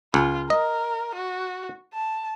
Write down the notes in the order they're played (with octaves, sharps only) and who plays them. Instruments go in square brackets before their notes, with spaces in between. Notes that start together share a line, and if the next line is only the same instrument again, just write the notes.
[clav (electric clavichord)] C#2 [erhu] F4
[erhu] A#4 [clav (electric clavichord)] D#5
[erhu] F#4
A5